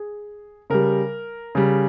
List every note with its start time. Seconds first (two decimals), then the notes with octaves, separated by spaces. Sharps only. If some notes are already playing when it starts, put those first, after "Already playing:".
Already playing: G#4
0.70 C#3 G3 A#4
1.55 C#3 G3